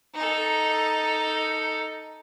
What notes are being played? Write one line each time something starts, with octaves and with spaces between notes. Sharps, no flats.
D#4 A4